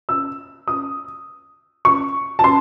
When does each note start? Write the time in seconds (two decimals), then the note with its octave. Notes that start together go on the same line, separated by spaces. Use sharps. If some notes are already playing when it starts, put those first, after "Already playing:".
0.09 E6
0.68 D#6
1.85 C#6
2.39 A5
2.44 C6